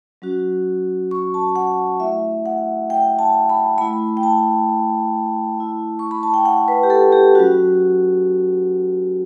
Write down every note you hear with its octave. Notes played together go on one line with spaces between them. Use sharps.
F#3 C#4 F#4
C#6
A5
F#5
A3 E4 E5
F#5
G5
A5
B5
A3 E4 B5
G5
A5
A3 E4
C#6
B5
A5
G5
F#5
B4
G4
A4
G4
F#3 C#4 F#4